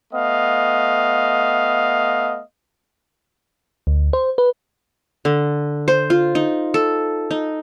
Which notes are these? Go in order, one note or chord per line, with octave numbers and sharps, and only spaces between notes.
A3 B3 D#5 F5
D2
C5
B4
D3
C5
F4
D#4
A4
D#4